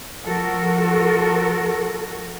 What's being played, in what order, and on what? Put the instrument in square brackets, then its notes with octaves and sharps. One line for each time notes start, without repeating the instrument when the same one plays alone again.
[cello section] F3 F#4 A4 A#4